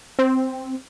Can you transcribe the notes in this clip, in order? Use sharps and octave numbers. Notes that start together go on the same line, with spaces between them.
C4